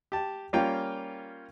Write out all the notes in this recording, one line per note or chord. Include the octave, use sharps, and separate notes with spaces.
G4 A5
G3 A#3 C#4 F4 G5